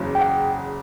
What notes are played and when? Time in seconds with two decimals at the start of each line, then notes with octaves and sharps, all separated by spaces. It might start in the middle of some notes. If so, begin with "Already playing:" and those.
Already playing: F#1 E2 C#3 F#3
0.15 G5
0.21 F#5